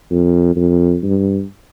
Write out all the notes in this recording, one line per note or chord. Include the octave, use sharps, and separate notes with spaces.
F2
F2
G2